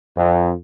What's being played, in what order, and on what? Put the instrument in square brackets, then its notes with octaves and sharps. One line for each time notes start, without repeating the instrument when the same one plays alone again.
[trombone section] F2